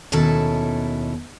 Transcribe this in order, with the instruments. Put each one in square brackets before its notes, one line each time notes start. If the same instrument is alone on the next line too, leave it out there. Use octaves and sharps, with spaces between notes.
[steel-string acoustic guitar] D#2 B2 C#4 E4 A4 A5